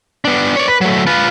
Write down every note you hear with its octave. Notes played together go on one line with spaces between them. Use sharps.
B3 D4
C#5 D5
B4
F#3 A3
F4 B4